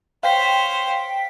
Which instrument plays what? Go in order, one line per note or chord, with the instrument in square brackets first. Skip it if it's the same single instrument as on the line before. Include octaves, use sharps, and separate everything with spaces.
[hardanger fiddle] C5 C#5 [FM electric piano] F5 G5 B6